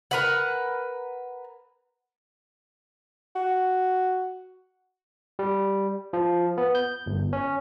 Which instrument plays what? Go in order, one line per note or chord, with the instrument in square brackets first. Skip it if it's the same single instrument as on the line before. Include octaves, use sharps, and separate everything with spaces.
[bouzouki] A#4 B4 F#5
[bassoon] F#4
[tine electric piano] G3
F3
B3
G6
G1
C#4